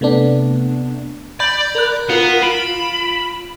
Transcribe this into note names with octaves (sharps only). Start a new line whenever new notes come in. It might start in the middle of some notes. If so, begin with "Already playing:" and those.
C3 A3 B3 D4
D5 B5 G6
A#4 F#6
B3 F4 A#4
F4 B5 D7 E7